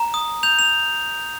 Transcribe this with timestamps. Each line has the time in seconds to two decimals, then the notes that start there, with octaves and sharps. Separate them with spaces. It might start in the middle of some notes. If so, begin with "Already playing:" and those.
Already playing: A#5
0.14 D#6
0.43 G6 F7
0.59 F7